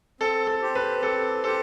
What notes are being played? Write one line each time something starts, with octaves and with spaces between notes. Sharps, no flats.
C4 A4
A4
G4 C5
B4
C4 A4
G4 A4 C5